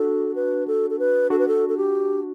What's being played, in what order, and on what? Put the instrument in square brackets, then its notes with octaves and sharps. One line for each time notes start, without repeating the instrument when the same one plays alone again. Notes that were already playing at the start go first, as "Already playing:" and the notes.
Already playing: [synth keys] D4 F#4 [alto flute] A4
[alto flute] B4
A4
A4
B4
[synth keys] D4 F#4 [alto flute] A4
[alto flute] B4
A4
A4
G4